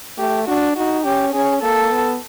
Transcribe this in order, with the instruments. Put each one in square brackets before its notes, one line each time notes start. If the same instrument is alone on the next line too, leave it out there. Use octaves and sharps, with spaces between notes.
[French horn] A3 [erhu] G4
[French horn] D4 [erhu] F#4
[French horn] D#4 [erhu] F#4
[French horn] C#4 [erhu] G4
[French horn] C#4 [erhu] G#4
[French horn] A#3 [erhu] A4
[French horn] B3